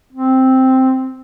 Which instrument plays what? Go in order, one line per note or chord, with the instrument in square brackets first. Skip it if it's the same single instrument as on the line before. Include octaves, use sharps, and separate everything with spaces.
[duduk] C4